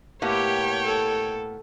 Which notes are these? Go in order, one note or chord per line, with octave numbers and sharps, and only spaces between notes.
A2 A#3 B3 G4 C#5 G5
A4